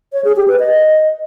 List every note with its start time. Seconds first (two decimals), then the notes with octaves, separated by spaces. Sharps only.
0.13 C#5
0.25 G#4
0.36 G4
0.48 B4
0.59 D#5